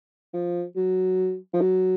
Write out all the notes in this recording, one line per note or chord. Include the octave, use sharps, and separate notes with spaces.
F3
F#3
F3
F#3